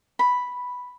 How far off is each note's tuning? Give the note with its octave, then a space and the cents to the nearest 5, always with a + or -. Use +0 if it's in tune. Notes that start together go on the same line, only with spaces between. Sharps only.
B5 +0